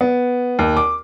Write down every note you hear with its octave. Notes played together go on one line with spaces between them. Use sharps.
B3
D#2
D6